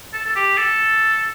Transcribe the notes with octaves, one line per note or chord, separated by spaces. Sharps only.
A4
A4
G4
A4